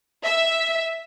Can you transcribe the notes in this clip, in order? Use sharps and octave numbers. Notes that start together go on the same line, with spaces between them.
E5